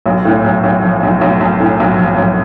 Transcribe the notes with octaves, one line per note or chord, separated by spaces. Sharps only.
B1
A2
B1
B1
F3
B1
B1
B1
A2
B1
F3
B1